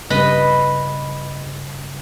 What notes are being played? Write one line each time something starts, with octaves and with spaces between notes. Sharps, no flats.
G2 C#3 B4 D#5 B5